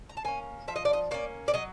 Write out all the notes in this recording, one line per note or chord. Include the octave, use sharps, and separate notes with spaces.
A#5
A5
A#3 C#4 G#5
F3 E5
D#5
D5
D#5
A#3 C#4 D5
D5
F#3 D#5